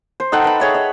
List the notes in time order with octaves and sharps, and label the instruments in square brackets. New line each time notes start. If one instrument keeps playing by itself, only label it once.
[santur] C5
D#4 A4 F#5 G5
B4 B5
G#4 C#5 E5
D#5